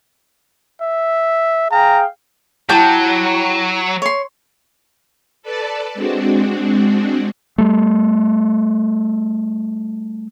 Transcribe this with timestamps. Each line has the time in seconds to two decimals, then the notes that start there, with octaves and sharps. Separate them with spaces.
0.81 E5
1.71 G#4 F5 G5 A#5
2.69 F#3 E4 G4 G5 A5 G6
4.02 C#5 C6
5.42 A4 B4 D5 A5
5.94 G#3 C4 D4 F#4
7.58 G3 A3